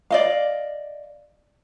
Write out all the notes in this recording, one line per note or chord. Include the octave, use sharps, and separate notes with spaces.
D5 D#5 F5